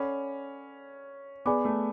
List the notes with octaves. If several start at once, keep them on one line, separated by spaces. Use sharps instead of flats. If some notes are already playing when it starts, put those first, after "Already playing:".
Already playing: C#4 A4 D5 F#5 B5 D6
B3 G#4 D5 G#5 B5 D6
A3